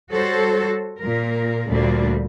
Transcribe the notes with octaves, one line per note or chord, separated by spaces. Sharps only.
G3 F#4 A4 C5 C#5
A#2 A#4
D2 A#2 G3 D4